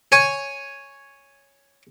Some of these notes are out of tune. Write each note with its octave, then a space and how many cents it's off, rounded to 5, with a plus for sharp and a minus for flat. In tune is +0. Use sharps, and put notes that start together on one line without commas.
C#5 +0 G#5 +0